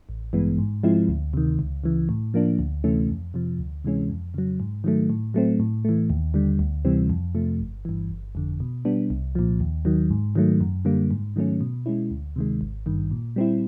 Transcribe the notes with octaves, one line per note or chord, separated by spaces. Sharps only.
A1
G2 E3 G#3 B3
G#2
F3 G#3 C4 E4
D2
C3 D#3
C#2
C#3 E3
A2
F3 A#3 D4
D2
C3 E3 A3 C#4
F2
C3 F3
D2
C3 E3 G#3 C#4
F2
C#3 F#3
G#2
D#3 F#3 A3
A2
F#3 A3 C4
A2
E3 A3
D#2
D3 G3
D2
C3 E3 G3 C4
F2
C3 F3 A3
G1
G2 E3
G1
F2 D3
B2
G3 B3 D4
C2
A#2 F3
D#2
D#3 F#3
G#2
D#3 F#3 A3
F#2
D3 G3 A#3
G#2
D#3 F#3 A3 C#4
B2
G#3 C#4 E4
D2
C3 D#3 G#3
G#1
G2 D#3
A#2
G3 C4 E4